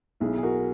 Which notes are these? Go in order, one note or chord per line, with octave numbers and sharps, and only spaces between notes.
B1 E4 G#4
G#4
F#4 A#4